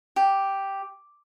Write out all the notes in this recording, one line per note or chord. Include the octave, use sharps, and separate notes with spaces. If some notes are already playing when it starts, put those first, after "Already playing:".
G4